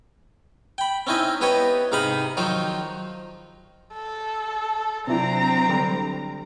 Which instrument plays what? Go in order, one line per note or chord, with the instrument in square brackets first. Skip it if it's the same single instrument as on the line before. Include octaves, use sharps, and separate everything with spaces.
[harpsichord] G5 B5
C4 C#4 D#4 E4 D#5
B3 G4 B4 C#5 D#5
G#2 C3 D#4 F5 B5 D#6
D#3 F3 F#3 D#4 C5
[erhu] A4
[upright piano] C3 D4 E4 [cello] F#3 C4 [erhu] A#5
[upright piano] D3 G3